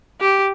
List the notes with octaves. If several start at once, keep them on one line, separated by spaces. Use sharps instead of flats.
G4